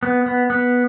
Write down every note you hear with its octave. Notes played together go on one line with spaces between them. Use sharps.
B3
B3
B3